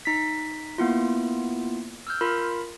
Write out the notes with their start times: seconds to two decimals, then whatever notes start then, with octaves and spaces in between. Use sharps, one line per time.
0.05 D#4 B6
0.78 A#3 B3 E4 F4
2.07 E6 F6 G6
2.21 F4 A#4 B5